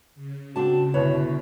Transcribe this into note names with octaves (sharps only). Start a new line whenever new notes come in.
C#3
C4 D4 F#4 A5
G1 B2 E4 B4 C#5